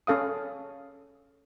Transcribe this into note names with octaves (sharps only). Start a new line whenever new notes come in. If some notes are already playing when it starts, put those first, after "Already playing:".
C#4 A4 F5 D#6